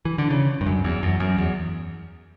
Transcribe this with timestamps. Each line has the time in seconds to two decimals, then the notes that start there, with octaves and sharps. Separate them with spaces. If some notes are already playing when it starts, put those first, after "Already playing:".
0.05 E3
0.18 D3
0.30 C#3
0.61 G2
0.66 F#2
0.84 E2
1.03 F#2
1.20 F#2
1.38 E2